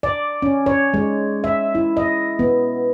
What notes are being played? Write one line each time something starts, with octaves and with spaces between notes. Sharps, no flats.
D5
C#4
C#5
G#3
E5
E4
D#5
B3